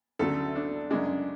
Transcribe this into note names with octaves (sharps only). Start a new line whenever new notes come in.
D2 C#3 F#3 A3 A4
D4
F#2 C#3 G#3 D4